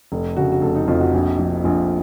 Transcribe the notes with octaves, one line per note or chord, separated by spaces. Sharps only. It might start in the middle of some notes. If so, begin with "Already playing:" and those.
F1
C#3 F#4
F#4
F1 A4
D#4
F2 F4
F#4
A#1 F#4
F3
A#1 F4